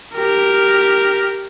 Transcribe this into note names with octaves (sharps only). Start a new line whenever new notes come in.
G4 A#4